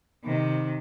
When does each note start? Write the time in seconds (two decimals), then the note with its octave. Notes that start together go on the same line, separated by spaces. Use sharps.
0.25 C3 D#3